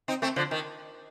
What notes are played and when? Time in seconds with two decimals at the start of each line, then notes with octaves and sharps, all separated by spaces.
0.08 C4 D#4
0.22 A3 C4
0.36 D3 F3
0.51 D#3